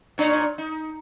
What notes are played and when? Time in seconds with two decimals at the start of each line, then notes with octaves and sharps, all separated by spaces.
0.18 A#2 D4 C#5
0.58 D#4